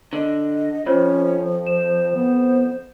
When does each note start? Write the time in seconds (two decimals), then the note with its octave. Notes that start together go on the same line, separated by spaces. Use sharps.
0.13 D3 D#5
0.86 F2 F3 C#4 F4 C5 C#5
1.67 C5 E7
2.15 B3 C5